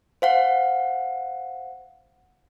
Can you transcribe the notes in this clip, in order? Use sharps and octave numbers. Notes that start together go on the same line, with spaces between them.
C5 F5 F#5